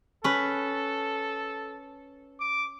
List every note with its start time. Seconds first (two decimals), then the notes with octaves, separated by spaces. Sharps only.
0.24 C#4 A4 B4
2.40 D6